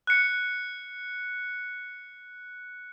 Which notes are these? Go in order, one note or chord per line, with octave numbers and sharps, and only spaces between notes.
F#6 C#7